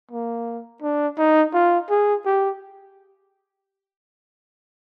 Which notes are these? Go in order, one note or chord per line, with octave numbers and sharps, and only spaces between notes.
A#3
D4
D#4
F4
G#4
G4